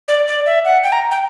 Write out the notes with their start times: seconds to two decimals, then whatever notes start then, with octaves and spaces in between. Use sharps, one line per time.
0.08 D5
0.27 D5
0.46 E5
0.65 F#5
0.84 G5
0.92 A#5
1.11 G5